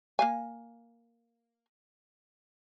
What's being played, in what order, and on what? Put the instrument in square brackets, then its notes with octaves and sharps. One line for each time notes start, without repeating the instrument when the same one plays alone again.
[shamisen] A#3 F5 G#5